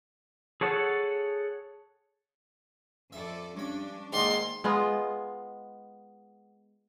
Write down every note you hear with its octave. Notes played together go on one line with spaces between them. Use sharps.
G#4 A4 C#5 F#5 A5
F2 A4 D5 E5
G2 C#4 D4 B5
G#2 D#3 A#3 G4 D5 D#5 C6
G#3 B3 F4